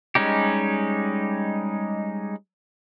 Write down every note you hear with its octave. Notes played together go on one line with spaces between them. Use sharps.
G3 G#3 C#4 D#4 G4